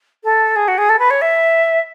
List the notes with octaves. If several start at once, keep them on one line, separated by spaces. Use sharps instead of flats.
A4
G#4
F#4
G#4
A4
B4
C#5
E5